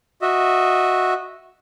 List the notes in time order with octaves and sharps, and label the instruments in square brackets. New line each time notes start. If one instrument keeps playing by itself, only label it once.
[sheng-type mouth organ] F#4 D#5 E5